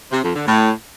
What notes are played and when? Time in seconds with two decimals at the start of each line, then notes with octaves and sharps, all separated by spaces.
0.12 C3
0.23 F2
0.35 D3
0.47 A2